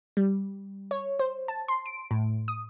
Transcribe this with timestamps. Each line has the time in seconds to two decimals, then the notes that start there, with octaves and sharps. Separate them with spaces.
0.17 G3
0.91 C#5
1.19 C5
1.48 A5
1.68 C6
1.86 D7
2.11 A2
2.48 D#6